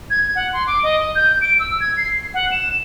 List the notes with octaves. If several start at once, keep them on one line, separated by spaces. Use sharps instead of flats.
G#6
F#5
C6
D6
D#5
G6
D7
E6
G#6
C7
F#5
E7